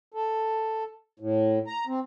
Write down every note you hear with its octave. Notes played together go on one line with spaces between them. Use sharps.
A4
A2
A#5
C4